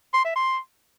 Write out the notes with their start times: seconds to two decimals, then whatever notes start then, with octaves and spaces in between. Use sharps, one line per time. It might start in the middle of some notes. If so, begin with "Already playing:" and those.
0.14 C6
0.25 E5
0.36 C6